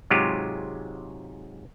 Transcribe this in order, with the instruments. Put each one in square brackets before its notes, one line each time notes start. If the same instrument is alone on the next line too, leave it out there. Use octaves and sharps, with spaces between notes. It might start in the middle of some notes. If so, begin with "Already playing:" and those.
[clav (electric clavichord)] G#2 C3 F#3 G#3 F4 G4